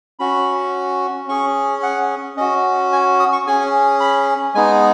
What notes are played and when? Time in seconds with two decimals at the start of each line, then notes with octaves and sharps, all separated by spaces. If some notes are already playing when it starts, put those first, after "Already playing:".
0.19 C#4 F#4 B5
1.28 C#4 G#4 C#6
1.83 F#5
2.37 C#4 F#4 D#5
2.92 G#5
3.20 D#6
3.33 C#6
3.47 C#4 G#4 G#5
4.00 B5
4.55 G#3 B3 D#4 G#4 G#5